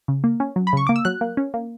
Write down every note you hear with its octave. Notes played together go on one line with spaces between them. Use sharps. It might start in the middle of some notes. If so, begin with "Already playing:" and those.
C#3
A#3
C#4
F#3
B5
C#3 C#6
A#3 D6
E6
F#3 F#6
A#3
C#4
A#3